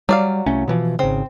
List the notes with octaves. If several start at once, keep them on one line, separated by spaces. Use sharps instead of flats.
F#3 G3 D5 F5
C2 A3 C#4
B2 E3 F3
G#1 C#3 C4